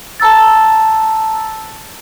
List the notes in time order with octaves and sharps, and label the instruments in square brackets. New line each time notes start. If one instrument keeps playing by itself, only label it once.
[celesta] A5 A#5 E6 A6